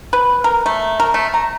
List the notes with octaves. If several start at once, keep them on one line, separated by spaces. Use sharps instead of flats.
B4
A#4
A3
A#4
A3
A#5